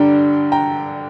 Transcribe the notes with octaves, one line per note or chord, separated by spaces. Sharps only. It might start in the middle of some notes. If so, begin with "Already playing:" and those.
Already playing: G2 D3 G3 D4 G5 A#5
G5 A#5